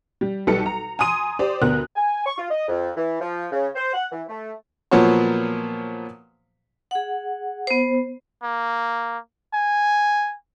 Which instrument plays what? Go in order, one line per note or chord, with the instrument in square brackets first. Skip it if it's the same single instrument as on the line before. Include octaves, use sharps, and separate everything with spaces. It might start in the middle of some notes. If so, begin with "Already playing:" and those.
[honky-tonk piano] G3
B1 G3 A4 B4 C#7
A#5
G#5 A#5 C6 D#6 D#7
G4 C5 D5
D2 B3 A#4 F#6
[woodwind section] G#5
C#6
F4
D#5
F2
E3
F3
C#3
C5
F#5
E3
A3
[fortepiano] A#2 F3 F#3 B3 C5 C#5
[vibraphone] G#4 F#5
B3 C5
[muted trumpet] A#3
G#5